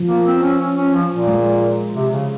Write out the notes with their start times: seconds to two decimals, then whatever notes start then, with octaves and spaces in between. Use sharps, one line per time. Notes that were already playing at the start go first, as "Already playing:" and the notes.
Already playing: F3
0.09 A#3
0.26 C4
0.43 C#4
0.60 C#4
0.77 C#4
0.94 F3
1.11 A#2
1.28 G#3
1.96 C3
2.13 C#3